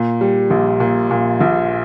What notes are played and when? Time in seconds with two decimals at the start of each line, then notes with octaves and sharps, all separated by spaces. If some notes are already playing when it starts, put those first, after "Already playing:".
Already playing: A#2
0.21 G3
0.50 A#1
0.80 A#2
1.11 A#2
1.40 A#1